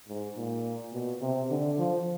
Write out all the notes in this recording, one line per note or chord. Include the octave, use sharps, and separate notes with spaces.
G#2
A#2
B2
C3
D3
F3